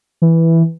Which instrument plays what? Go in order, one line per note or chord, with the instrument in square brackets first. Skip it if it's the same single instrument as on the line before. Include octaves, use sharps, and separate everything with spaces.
[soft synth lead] E3